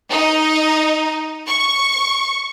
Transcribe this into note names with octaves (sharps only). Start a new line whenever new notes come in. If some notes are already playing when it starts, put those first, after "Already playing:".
D#4
C#6